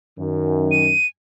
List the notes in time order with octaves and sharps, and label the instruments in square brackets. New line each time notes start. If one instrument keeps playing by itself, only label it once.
[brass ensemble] F#2 D#3
[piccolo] D#7